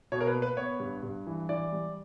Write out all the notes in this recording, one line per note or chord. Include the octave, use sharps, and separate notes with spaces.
B2 C#5
A#4
B4
A#3
B4
B3 C#5
G2
G2
E3
E3 D5
G3